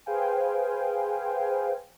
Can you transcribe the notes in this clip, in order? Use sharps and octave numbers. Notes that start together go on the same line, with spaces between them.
G#4 B4 C5 F5 G5 G#5